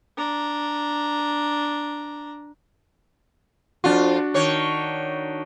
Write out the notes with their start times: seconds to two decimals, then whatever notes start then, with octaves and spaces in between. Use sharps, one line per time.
0.17 D4 A#5
3.84 F2 D4 F4 F#4
4.34 D#3 C#5